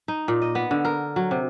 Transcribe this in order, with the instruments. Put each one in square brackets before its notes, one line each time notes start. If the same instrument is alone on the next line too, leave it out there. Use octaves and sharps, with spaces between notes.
[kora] D#4
A#2
D#5
B3
D3
A#4
F#3
C3